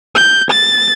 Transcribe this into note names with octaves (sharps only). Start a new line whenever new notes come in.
G6
A6